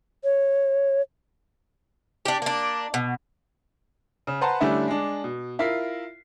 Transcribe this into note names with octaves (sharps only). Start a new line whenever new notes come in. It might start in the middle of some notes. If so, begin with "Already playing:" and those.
C#5
D4 G4
A#3 D4
B2
C#3
B4 C5 F#5 A5 A#5 C6
D3 G3 A3 C#4 D4 E4
G#3 D4
B2
E4 F4 A#4 B6 C7